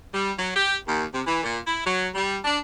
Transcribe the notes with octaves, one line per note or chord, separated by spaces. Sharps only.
G3
F#3
G4
D#2
C3
E3
A#2
E4
F#3
G3
D4